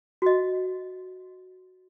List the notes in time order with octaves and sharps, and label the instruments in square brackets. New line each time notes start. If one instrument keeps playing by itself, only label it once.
[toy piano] F#4 D#5